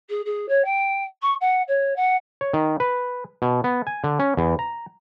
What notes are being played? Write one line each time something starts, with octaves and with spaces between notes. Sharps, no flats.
G#4
G#4
C#5
G5
C#6
F#5
C#5
F#5
C#5
D#3
B4
B2
B3
G#5
D3
C#4
E2
A#5